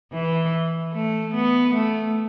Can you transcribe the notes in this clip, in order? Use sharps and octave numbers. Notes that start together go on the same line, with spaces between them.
E3
A3
B3
A3